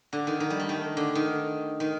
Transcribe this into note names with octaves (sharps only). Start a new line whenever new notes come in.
D3
D#3
D#3
G3
A3
D#3
D3
D#3
D#3